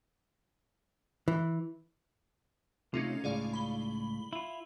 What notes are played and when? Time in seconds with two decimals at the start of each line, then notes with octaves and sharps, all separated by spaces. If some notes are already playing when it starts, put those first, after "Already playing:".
1.28 E3
2.94 C3 A3 C#4 D#4 F4
3.24 C#2 A2 G#4 D5 F5
3.53 B5 G7
4.33 E4 F4